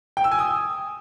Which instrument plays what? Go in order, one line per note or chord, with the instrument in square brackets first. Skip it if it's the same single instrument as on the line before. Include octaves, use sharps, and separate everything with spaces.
[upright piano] G5
E6
G#5
D#6